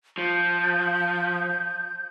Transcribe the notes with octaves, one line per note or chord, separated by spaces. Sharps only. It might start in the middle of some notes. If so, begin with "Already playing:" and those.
F3 G6